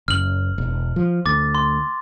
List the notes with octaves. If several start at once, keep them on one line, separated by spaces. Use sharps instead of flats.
F#1 F6 F#7
E1
F3
D2 D6 A6
C6